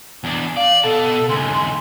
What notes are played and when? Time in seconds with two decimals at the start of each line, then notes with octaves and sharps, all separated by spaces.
0.24 E2 D4
0.56 D5 F5
0.84 B2 A4 A5
1.29 D#2 C#3 C6